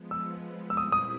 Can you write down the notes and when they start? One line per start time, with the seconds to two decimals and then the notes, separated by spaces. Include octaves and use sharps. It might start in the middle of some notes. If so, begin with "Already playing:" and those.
Already playing: F3 G#3 B3
0.11 E6
0.70 E6
0.77 A#2 G3 C4 E4 D#6
0.92 D#6